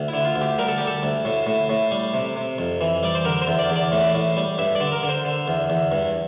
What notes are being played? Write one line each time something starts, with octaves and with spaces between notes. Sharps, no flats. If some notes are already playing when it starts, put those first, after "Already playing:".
Already playing: D2
E4
D3
F4
D2
G4
G3 A#4
A4
G3 G4
A4
D2
A2
A2
A2
G3
C3
C3
F2
E3
G3 D5
C5
D3 A#4
C5
E2
D5
E2
D5
A2
A2
G3
G2 E5
D5
D3
A#4
D3
C5
D3
E2
E2
G2